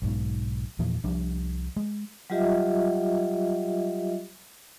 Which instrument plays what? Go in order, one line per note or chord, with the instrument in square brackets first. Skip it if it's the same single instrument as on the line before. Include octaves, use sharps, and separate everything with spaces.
[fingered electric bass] B1 G#2 B2
E2 A#2 E3 F3
C2 F3 G3 D4
G#3
[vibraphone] F#3 G3 F4 G4 D#5 E5